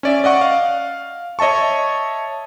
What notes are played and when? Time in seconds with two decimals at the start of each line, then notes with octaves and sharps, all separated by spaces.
0.03 C#4 D5 E5
0.24 D5 D#5 F#5 C#6
0.41 F5
1.39 C#5 D#5 E5 A5 C#6